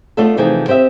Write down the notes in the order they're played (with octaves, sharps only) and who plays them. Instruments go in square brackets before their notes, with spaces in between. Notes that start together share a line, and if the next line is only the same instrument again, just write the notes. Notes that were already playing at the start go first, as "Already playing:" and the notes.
[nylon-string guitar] A3 B3 D4 F4 A4
C3 E3 F3 A3 D#4 G#4
C4 G4 D#5 E5